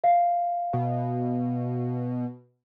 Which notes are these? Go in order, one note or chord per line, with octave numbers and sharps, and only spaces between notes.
E5 F5
B2